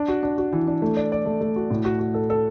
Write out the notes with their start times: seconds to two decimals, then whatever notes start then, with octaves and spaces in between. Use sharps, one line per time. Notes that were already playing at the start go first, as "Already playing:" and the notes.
Already playing: D4
0.08 F#4
0.23 D4
0.38 F#4
0.52 E3
0.67 D4
0.82 A3
0.97 D5
1.12 D5
1.26 A3
1.41 A3
1.56 F#4
1.70 A2
1.85 F#4
1.99 F#4
2.14 A4
2.30 A4